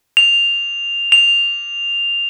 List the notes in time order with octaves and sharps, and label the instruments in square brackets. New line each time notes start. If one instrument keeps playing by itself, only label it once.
[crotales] F7
F7